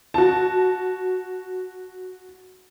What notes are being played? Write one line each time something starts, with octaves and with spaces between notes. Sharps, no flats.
F#4 A5